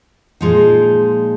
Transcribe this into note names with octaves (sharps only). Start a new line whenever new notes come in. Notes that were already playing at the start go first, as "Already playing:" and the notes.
A#2 F3 G#3 D#4